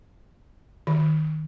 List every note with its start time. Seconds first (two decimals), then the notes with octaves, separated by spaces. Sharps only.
0.87 D#3